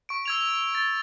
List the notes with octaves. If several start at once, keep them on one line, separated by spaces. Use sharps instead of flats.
C#6 D7
E6 G#6 F7
A6